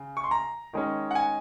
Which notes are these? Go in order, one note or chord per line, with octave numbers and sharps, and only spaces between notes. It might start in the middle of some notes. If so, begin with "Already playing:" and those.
Already playing: C#3
C#6
C6
A#5
D#3 G#3 C#4
F#5
G#5